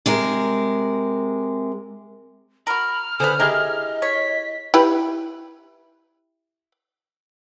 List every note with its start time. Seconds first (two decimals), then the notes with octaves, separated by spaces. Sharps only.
0.06 C3 G#3 A#4
2.67 F#4 A#4 B5 F6
3.20 D3 G#4 B4 C5
3.40 E4 G4 G#4 A#4 D#5
4.02 C#5 B6
4.74 E4 G4 B4